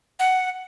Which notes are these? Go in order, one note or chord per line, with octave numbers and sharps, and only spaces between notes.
F#5